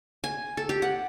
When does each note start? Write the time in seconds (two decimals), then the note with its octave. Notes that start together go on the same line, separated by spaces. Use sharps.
0.24 G#5
0.57 A4
0.69 G4
0.82 F#5